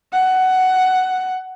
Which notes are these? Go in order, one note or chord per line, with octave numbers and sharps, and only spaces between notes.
F#5